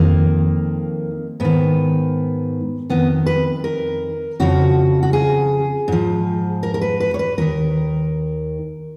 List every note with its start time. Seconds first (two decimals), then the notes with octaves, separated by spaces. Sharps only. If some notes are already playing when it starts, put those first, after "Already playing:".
Already playing: F2 D#3 A#3
1.40 G#2 D#3 B3
2.90 F2 D#3 B3
3.26 B4
3.64 A#4
4.40 F2 C#3 F3 F#4
5.03 F#4
5.13 G#4
5.88 G#2 F3
6.63 A#4
6.74 A#4
6.81 B4
7.00 B4
7.14 C#5
7.19 B4
7.38 D#2 D#3 A#4